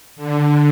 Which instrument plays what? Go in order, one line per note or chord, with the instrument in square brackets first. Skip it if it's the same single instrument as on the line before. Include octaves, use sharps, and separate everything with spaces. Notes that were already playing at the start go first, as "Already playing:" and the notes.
[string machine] D3